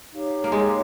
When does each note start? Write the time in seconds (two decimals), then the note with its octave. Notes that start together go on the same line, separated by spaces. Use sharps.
0.12 D#4 G4 C#5 F5
0.44 A#3
0.52 G#3